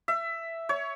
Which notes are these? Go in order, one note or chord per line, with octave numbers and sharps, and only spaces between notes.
E5
C#5